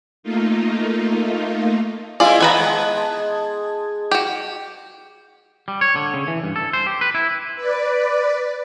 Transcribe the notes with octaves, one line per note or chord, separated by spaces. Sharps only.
A3 A#3 D#4 F4
G#3 C4 E4 F4 G#4 D5
D#3 B3 B4 A5 A#5 D#6 G#6
G#3
F#4 G4
G3
C#5
D3
C#3
E3
G2
A4
C5
G4
B4
E4
B4 D5